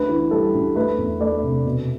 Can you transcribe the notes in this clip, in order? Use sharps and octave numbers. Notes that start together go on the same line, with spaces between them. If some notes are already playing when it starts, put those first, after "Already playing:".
Already playing: D2 B4
E3
G3 A4
D2
A3 B4
E2
A3 D5
C3
B2